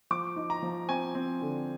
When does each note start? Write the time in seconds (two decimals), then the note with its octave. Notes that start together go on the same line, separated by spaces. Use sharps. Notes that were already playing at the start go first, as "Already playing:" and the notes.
0.11 F3 D6
0.36 D#4
0.50 A#5
0.62 F3
0.88 C4 G#5
1.15 C4
1.42 D3